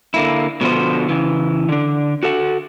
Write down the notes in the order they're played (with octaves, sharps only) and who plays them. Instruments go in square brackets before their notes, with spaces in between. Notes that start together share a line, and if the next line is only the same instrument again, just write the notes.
[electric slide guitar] D3 A#3 E4
B2 D3 F3 B3 C5
C#3 E3
D3 D4
F#4 A4 F#5